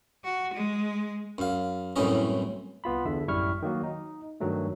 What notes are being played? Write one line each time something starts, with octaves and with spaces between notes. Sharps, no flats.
F#4
G#3
F#2 F5
C2 F#2 A2 E3 C#4 D#5
C2 B3 F4 B5
E2 D3 E5
A1 F#2 G3 E4 C#6 F6
D#3 F#3 A#3 F#4
D#4
G2 D#3 F#3 A3